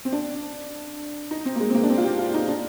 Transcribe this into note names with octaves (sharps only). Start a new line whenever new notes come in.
C4
D4
D#4
C4
A#3
G#3
C4
A#3
D4
C4
F4
G4
F4
D#4
D4